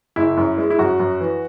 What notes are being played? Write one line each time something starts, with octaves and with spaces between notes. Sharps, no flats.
F#1 E4
F#2
G#3
E4
F#2 F#4
F#2
E3